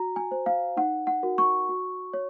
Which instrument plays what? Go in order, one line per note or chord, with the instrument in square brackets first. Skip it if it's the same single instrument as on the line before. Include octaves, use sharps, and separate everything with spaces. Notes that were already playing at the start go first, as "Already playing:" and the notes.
Already playing: [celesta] F#4 A#5
G#5
C5
F5
D#4 F#5
F#5
F#4 A#4
C#6
F#4
C#5